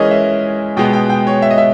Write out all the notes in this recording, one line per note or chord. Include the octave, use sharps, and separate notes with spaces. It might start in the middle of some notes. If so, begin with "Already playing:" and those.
Already playing: E3 G#3 C#4 G#4 A#4 C#5 D#5
E5
B2 G#3 B3 G5
G5
G5
C#5
E5
D#5
E5